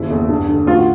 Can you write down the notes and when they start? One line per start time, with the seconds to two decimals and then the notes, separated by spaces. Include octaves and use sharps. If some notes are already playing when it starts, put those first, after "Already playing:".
Already playing: F#1 D#2 E4
0.10 E2
0.29 G2
0.49 D3
0.67 A1 F4
0.75 F#4